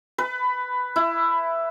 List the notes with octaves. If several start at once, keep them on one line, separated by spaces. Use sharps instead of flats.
B4
E4